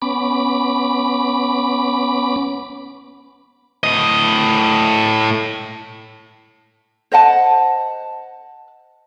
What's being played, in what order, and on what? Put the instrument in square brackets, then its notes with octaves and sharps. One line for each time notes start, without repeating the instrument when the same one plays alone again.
[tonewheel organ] B3 C#4 B5 D6
[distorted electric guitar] A2 D#5
[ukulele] C5 D#5 F#5 A5